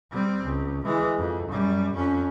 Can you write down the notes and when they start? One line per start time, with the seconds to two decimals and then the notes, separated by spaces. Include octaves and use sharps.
0.11 G3 C4
0.45 C#2
0.85 E3 G#3
1.18 F2
1.48 F#2 G3
1.95 F2 C#4